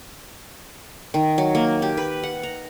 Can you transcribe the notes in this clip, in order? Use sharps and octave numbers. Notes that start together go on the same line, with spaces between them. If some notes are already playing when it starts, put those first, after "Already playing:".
D#3
F#3
A#3
G4
B4
F#5
A#5